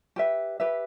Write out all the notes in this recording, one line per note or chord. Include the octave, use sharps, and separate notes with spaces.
G4 B4 E5
G4 B4 E5